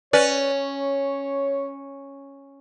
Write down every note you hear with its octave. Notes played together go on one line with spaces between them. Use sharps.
C#4 B4 C#5 D5